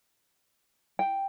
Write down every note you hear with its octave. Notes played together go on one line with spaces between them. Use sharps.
G5